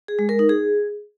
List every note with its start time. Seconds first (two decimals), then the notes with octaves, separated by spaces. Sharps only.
0.08 G#4
0.19 G#3
0.29 A#4
0.39 D#4
0.49 G#4